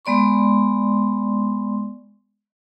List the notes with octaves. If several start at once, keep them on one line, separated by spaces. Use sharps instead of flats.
G#3 B3 D5 C6 C#6